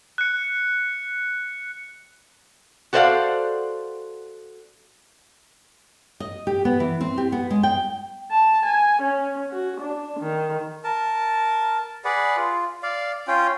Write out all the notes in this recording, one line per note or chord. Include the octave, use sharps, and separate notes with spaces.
F#6 C#7
F#4 A4 C5 D5 F5 F#5
D#5
G4
B3
E3
C4
G4
B3
G#3
G5
A5
G#5
C#4
F#4
D4
D#3
A#4 A5
G#4 B4 D5 F#5
F4
D5 F5
C#4 F4 G5